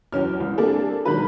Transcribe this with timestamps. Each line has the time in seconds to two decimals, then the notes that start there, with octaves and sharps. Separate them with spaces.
0.12 E2 F#3 C#4 F6
0.40 C2
0.58 G3 A#3 C4 D4 G#4 A4
1.05 B2 D#3 F#3 G#3 A#4 B4